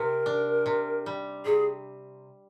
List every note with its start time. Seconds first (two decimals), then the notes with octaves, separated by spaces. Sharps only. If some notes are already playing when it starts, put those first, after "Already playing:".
Already playing: C3 A#4
0.26 D4
0.66 C3
1.06 G3
1.46 C3 G#4